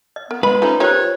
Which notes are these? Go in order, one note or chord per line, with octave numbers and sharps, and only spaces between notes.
D#5
B3 A#4
G#3 B4 B5
A3 C#4 D#4 F4 C5
D#3 F4 G4 C5 C#5